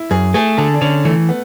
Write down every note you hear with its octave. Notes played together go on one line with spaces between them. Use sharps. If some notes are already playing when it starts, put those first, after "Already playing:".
Already playing: E4
F#2 G#4
A3 G#4
D3 A4
D4
D3 C#4
E3 A3
B3